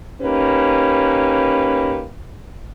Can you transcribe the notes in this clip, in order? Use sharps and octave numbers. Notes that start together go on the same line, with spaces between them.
A#3 C#4 D#4 G4 B4